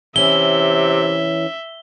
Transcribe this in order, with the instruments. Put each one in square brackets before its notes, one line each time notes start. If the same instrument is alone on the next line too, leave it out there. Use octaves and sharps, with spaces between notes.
[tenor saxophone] C3 [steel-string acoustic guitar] E3 C#4 E4 [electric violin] E5 [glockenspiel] G7